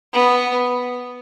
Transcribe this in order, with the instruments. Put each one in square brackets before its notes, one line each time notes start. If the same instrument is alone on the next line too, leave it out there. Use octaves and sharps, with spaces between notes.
[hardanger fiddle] B3